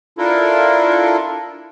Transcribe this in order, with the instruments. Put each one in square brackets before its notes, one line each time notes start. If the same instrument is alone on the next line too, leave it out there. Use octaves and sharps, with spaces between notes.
[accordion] D4 E4 F4 A4 A#4